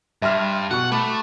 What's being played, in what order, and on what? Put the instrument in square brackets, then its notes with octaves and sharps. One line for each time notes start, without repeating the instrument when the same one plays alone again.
[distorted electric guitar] G2 [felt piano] E5 C6 F6
[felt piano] B2 C#6 [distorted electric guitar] F#5
[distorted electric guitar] A3 [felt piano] B5 D6